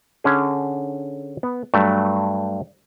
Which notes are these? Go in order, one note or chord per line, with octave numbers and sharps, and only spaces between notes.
D3 C#4 G#4
B3
G2 F#3 A3